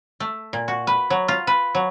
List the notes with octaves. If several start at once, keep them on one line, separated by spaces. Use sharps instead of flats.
A3
A#2
F#4
B4
F#3
F4
B4
F#3